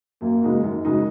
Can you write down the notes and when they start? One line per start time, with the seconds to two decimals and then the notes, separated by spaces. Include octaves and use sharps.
0.22 F#2 A#3
0.42 C#3 G#3 D#4 F#4
0.63 F#2 D#3
0.84 C#3 G#3 D#4 F#4